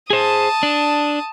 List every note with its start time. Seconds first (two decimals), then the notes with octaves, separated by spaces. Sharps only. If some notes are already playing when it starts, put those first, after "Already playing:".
0.10 G#4 C5 A5 D#6
0.63 D4